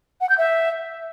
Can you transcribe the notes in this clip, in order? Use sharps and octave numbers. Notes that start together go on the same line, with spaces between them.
F#5
G6
E5